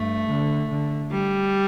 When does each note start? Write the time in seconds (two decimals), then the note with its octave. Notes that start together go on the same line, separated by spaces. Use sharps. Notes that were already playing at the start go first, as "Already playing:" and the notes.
Already playing: G2 A3
0.30 D3
0.71 D3
1.11 G3